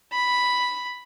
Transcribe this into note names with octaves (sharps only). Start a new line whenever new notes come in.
B5